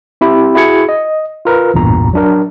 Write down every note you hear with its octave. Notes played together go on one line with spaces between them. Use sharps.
C4 E4 G4
E4 F#4 G#4 G#6 C#7
D#5
F4 A#4 B4
A1 E2 G2 A#2 A#5
F#3 D4 A#4